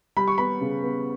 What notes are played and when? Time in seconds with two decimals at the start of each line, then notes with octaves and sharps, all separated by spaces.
0.17 G3 B5
0.28 C#6
0.38 B3 B5
0.61 C#3
0.83 B3